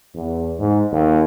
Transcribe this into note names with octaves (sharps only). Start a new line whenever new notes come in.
E2
G#2
D#2